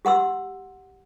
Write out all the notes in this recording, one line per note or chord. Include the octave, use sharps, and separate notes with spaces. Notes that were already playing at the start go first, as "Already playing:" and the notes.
G4 F#5 C6 E6